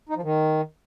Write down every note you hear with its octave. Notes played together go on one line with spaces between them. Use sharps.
D#4
F3
D#3